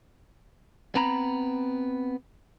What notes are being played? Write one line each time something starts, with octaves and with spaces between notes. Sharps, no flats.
B3 C4 A#5 B5